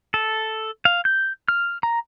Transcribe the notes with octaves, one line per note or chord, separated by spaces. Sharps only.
A4
F5
G6
F6
A#5